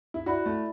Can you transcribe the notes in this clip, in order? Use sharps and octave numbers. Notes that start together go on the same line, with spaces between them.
E4
E4 F#4 D5 B5
A3